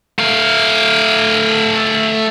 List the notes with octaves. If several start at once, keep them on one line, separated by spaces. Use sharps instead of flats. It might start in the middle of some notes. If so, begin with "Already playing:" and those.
A3 F5